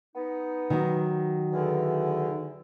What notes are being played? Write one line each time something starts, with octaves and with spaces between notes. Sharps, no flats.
B3 D#4
D#3 F#3
E2 D3